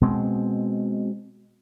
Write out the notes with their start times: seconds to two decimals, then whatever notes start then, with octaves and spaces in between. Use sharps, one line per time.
0.01 B2 G#3 C4